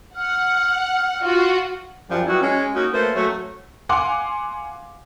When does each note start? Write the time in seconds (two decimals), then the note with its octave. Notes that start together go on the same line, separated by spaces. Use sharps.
0.16 F#5 F6
1.23 F4 F#4
2.09 F#2 F3 G3
2.27 F#3 G3 B3 E4 F#4
2.41 G#3 C#4
2.74 A#3 C#4 D#4 F#4
2.92 A3 A#3 C#4 B4 C5
3.15 F#3 A3 C#4 F#4 C#5
3.89 F5 F#5 G#5 C6 D6